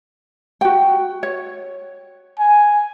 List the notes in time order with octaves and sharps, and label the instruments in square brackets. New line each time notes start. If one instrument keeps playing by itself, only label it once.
[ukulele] F#4 G5
C#5
[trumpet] G#5